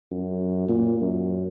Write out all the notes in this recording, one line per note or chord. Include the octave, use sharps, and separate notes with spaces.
F#2
A#2
F#2